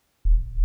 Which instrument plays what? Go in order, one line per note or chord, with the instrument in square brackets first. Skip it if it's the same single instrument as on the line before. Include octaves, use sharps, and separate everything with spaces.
[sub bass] D#1